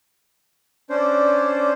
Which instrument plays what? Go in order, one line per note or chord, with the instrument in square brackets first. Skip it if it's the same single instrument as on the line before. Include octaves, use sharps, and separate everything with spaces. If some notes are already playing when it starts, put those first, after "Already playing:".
[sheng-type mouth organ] C#4 D4 C5 [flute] D5